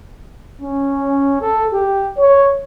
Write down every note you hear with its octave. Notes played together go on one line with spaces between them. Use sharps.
C#4
A4
G4
C#5